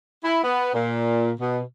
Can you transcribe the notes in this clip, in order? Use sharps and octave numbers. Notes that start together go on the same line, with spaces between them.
E4
B3
A#2
B2